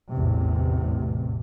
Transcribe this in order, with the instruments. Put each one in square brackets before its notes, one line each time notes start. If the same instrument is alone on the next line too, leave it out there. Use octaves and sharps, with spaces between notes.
[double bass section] A1 E2 C3